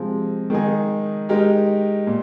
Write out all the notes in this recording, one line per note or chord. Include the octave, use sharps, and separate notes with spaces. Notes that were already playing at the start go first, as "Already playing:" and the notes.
Already playing: C3 F3 G#3 C4 F4
D#3 G#3 D#4 G#4
G#3 D#4 G4 A#4
A#2